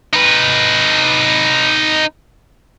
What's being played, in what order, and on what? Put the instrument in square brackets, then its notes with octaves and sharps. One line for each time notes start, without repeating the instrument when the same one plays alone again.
[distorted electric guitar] D#4 B4